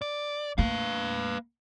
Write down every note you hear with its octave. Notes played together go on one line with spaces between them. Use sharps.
D5
A3 A#3 B4 F5